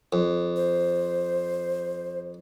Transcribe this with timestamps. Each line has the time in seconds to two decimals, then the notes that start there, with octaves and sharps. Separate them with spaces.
0.13 F2
0.56 C5